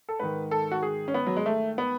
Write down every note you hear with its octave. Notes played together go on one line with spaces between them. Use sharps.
A4
G#2 D#3 B4
A4
F#4
G#4
C#4
B3
F#3
G#3
A3
B3